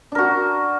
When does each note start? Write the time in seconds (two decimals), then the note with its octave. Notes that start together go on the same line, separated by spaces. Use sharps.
0.12 D4
0.15 A#4
0.18 F#4